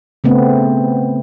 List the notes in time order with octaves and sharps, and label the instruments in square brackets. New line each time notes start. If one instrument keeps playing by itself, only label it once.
[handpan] C#3 A3 B3 C4